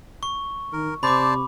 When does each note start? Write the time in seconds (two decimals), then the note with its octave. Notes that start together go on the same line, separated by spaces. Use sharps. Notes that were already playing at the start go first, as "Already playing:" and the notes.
0.23 C#6
0.73 D#3 A#4
1.03 C3 C5 D5 A5 B5 D6